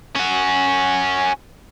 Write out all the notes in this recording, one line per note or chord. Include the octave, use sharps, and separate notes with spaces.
C#4 F#4